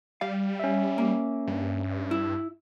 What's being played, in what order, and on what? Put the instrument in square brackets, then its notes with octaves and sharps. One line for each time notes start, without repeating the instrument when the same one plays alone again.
[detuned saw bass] G3 [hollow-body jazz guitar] F5
[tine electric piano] C#4 E5
[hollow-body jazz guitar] A#3
[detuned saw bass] G2
[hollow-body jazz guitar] E4